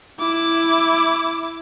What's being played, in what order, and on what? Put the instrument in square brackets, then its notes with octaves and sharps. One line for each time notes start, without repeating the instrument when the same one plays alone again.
[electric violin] E4 D6